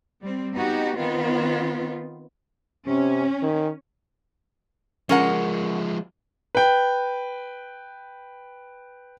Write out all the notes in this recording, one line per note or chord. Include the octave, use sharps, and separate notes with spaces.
G3 C4
B3 D#4 F#4 G4
D#3 B3 C4 F4
C3 C#4
D#3
F3 G#3 C#4 A#4 F#5
B4 G5